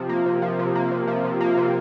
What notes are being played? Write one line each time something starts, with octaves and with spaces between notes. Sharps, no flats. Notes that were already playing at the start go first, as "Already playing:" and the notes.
Already playing: C3 F3
A#3
C3
F3
C3
A#3
C3
F3
C3
A#3
C3